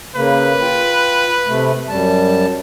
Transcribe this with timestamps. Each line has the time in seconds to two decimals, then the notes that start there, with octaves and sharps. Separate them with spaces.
0.15 C#3 A#3 B4
0.62 F4 G5
1.47 C3 A3
1.88 F#2 G3 A5